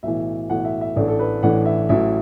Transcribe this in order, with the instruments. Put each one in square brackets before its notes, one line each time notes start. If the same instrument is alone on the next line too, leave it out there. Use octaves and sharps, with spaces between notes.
[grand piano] B1 A2 E3 E5
B1 A2 E3 F#5
E5
E5
A1 A2 E3 A3 D4
A4
B4
A1 A2 E3 A3 D4 F#5
E5
A1 A2 F#3 E5